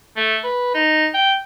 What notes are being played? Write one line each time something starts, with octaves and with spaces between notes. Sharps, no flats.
A3
B4
D#4
G5